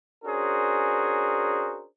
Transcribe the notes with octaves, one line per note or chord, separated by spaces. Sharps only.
C#4 D4 F#4 G#4 A#4 C5